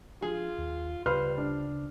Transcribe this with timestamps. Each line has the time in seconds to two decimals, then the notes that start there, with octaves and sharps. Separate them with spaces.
0.22 F3 D4 F4 G#4
0.58 D#2
1.06 D2 C#3 G3 F4 B4 C5 F6
1.38 D4